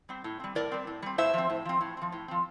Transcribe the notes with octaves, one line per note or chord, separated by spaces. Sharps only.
G3 C4
A2
G3 C4
A2 A#4 D5
G3 C4
A2
G3 C4
A2 C5 E5
F3 C4
A2
F3 C4
A2
F3 C4
A2
F3 C4